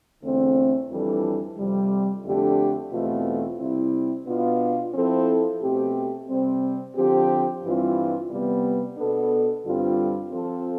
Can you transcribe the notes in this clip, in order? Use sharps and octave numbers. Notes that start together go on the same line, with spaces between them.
E2 D3 A3 C4
F2 E3 G3 D4 A4
F2 C3 G3
F2 D3 A3 D4 G4
E2 B2 A3 C4 F4
C3 G3 C4 E4
B2 B3 D4 F4
F3 C4 E4 A4
B2 A3 C4 G4
C3 G3 C4
D3 F3 C4 G4
G2 E3 G3 C4 F4
C3 G3 B3
B2 B3 D4 A4
G2 D3 G3 C4 F4
F3 C4 F4 A4